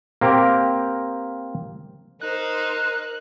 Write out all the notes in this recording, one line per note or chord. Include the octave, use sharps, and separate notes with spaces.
A#3 C4 G4 A#4
D#4 A#4 C5 F#6